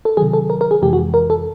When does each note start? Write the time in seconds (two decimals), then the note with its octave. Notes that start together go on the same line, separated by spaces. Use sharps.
0.05 A4
0.17 C3 D#3 F#3 G#4
0.33 A4
0.50 A#4
0.61 A#4
0.71 G#4
0.82 F2 C3 E3 G#3 G4
0.93 F#4
1.14 A#4
1.30 A4